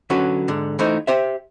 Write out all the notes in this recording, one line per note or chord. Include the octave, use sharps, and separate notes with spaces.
D3 F#3 C#4 F#4 B4
G#2 D3
E3 A3 D#4 C5
G4 C5 E5